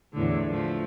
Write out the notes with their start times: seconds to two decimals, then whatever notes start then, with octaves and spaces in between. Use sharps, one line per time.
0.14 E2 A2 D3
0.49 F3 A3